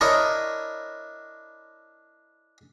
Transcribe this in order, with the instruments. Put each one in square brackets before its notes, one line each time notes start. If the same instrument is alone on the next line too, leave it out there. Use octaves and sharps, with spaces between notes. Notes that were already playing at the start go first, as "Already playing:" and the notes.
[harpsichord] D4 E4 A#4 C#5 D#5